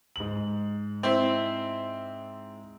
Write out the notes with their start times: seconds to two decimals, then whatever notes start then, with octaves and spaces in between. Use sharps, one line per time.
0.16 G#2 F#7
1.03 C4 E4